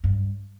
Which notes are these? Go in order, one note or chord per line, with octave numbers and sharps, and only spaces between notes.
G2